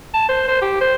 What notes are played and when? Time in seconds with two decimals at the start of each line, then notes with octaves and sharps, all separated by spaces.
0.14 A5
0.29 C5
0.48 C5
0.62 G4
0.81 C5